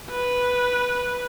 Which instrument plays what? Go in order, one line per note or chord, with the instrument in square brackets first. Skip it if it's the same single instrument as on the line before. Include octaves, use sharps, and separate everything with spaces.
[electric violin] B4